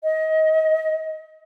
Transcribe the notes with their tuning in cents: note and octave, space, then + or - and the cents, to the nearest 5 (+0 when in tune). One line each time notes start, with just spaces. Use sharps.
D#5 +25